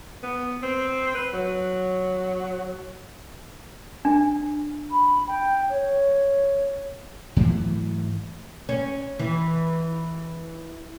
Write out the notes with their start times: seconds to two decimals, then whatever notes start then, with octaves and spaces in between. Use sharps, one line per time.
0.23 B3
0.63 C4
1.15 B4
1.33 F#3
4.05 D4
4.91 B5
5.28 G5
5.70 C#5
7.36 G#2 E3 F#3 A3
8.69 C#4
9.19 E3